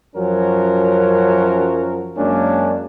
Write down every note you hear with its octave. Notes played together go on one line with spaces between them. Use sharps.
F#2 F3 F#3 C#4 F#4 A#4
F#2 G#3 A#3 C#4 D4